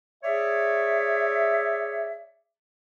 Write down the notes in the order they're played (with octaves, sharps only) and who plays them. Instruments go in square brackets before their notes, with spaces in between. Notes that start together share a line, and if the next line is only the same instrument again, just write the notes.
[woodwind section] G#4 C#5 D5 E5